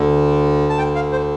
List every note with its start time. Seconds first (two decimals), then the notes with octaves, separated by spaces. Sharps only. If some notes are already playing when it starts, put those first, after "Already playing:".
Already playing: D2 D3
0.70 A5
0.78 G5
0.95 F5
1.12 C5